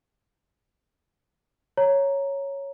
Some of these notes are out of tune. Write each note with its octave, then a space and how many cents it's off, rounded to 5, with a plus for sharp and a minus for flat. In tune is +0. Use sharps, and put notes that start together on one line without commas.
C#5 +0 A#5 +0